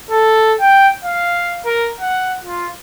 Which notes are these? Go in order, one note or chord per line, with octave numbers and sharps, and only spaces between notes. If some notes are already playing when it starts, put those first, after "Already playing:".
A4
G5
F5
A#4
F#5
F4